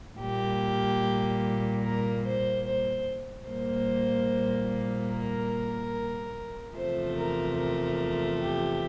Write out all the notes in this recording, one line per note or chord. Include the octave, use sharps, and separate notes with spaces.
A#2 G3 A#3 G4
A#4
C5
C5
A#2 G3 A#3 C5
A#4
E2 C3 F3 A3 C5
A#4
A#4
G4